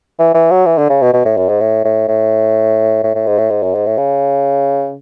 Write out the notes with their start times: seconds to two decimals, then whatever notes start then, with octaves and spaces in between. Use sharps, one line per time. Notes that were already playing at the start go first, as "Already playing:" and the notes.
0.19 E3
0.34 E3
0.51 F#3
0.66 E3
0.78 D3
0.90 C#3
1.02 B2
1.13 B2
1.25 A2
1.37 F#2
1.49 G#2
1.61 A2
1.85 A2
2.08 A2
3.03 A2
3.15 A2
3.27 G#2
3.38 A2
3.50 G#2
3.63 F#2
3.75 G#2
3.86 A2
3.97 C#3